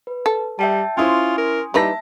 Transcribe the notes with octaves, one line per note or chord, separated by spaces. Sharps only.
B4
A4
G3 E5 G5 A5
C#4 E4 F4 C5 G#5 C6 D#6
A#4
E3 G3 D#4 B4 E5 A5 A#6